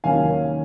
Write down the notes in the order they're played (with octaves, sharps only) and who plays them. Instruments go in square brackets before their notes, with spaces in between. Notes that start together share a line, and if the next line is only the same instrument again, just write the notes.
[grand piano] D#2 D#3 F#3 A#3 C#4 F5 G#5